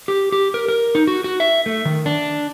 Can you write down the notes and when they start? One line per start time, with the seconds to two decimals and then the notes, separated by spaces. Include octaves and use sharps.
0.08 G4
0.32 G4
0.54 A#4
0.68 A#4
0.95 D#4
1.07 F#4
1.24 F#4
1.40 E5
1.66 A3
1.85 D#3
2.06 D4